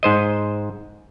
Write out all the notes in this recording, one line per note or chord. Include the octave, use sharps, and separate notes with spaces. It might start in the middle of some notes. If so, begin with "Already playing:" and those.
G#2 C5 D#5